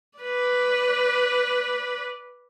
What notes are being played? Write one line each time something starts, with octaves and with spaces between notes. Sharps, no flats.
B4 D5